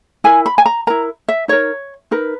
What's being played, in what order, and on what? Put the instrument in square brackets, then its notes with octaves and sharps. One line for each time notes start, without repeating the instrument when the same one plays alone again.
[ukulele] E4 A#4 G#5
B5
G#5
A#5
E4 A#4 A#5
E5
D#4 A#4 C#5
D#4 A#4 B4